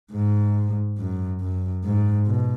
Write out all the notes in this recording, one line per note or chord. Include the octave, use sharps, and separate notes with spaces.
G#2
F#2
F#2
G#2
B2